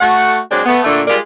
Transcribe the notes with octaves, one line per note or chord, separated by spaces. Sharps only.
A3 F#4 F#5
F#3 G#3 C4 D4
A3 B3
A#2 D3 A3
G3 G#3 F4 G4 A#4 D5